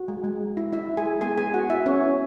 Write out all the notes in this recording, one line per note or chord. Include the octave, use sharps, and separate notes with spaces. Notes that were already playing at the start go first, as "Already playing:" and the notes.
Already playing: F#4
G#3
G#3
G#3
E4
E4 E5
G#3
G#4 G#5
G#3
B3 G#4 G#5
B3 G#4 G#5
E4 F#4 F#5
B3 E4 E5
B3 C#4 C#5
E4